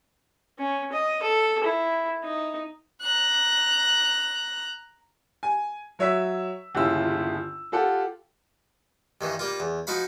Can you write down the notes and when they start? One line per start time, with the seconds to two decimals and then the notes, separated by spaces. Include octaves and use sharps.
0.59 C#4
0.92 D#5
1.22 A4
1.64 E4
2.24 D#4
3.02 A#5 F#6
5.43 G#5
5.99 F#3 C#5 E5 E6 B6
6.75 G1 D#2 C#3 E4 F4 E6
7.72 F4 G4 A4 F#5
9.21 G2 D#3 E3
9.39 G3 A#3 F4
9.60 E2
9.87 F3 D#4 F#4 F5 B5